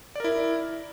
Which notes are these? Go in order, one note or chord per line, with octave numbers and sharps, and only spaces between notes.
E4 A#4 D5